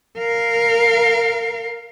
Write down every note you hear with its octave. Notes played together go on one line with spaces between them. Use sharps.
A#4 F5